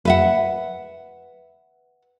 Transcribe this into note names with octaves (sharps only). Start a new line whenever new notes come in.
B4 E5 F#5